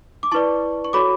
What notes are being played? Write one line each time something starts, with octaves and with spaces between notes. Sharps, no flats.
D6
E4 B4 D5 A5 C#6
C#6
F#4 A4 C#5 B5 D6